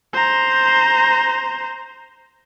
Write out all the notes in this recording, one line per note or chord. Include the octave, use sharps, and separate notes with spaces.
C5 A#5